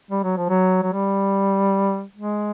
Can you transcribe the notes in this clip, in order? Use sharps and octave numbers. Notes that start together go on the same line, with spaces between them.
G3
F#3
F3
F#3
F#3
G3
G#3